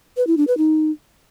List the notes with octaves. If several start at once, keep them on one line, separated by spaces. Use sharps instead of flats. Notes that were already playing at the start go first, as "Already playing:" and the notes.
B4
E4
D4
B4
D#4